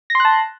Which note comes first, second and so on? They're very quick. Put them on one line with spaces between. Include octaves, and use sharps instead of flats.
A#6 C6 F#6 A5